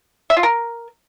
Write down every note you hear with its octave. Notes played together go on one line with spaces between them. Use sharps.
E5
F4
A#4